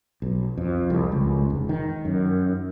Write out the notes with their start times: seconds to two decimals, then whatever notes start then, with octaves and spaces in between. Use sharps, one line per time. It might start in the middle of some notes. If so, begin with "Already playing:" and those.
0.22 B1
0.57 F2
0.90 C2
1.12 C#2
1.50 F1
1.69 D#3
2.05 F#2